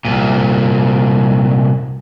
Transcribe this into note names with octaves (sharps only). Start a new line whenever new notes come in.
C2 A#2